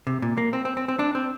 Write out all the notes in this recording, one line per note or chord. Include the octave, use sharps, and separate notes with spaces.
C3
A#2
A#3
C4
C4
C4
C4
D4
C4